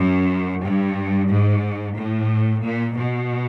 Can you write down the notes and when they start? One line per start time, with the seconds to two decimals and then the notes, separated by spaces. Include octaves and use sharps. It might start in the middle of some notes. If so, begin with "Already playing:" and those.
Already playing: F#2
0.61 G2
1.27 G#2
1.95 A2
2.61 A#2
2.95 B2